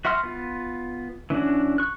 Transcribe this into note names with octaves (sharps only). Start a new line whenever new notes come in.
F#4 E5 F#5 C6 F6
B3 F4
E3 C#4 D4 F#4
C#6 F#6